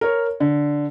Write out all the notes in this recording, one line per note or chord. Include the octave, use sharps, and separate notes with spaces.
A#4 C#5
D3